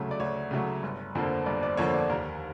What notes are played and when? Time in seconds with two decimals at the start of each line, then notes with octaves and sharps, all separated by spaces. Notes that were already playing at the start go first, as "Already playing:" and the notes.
Already playing: D2 C#3 F#3 A3
0.11 D5
0.19 D2 C#5
0.51 C#3 F#3 A3
0.83 G1
1.15 F2 D3 F3 A#3
1.46 G1 D5
1.63 D5
1.77 F2 D3 F3 A#3 C#5
1.94 D5
2.09 D#2 A#4